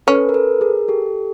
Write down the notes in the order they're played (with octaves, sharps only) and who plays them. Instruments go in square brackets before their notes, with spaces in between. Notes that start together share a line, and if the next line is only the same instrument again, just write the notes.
[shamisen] C#4 [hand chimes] A4 B4
[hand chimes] A#4
A4 B4
G#4 A#4
G4 A4